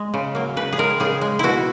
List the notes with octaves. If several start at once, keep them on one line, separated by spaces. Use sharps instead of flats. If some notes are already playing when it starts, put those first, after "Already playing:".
Already playing: G#3 D#5
C#3
F#3 A#3
C#3 B4
G#4
G#3 A#4
C#3 G#4
G#3
B2 E4 F#4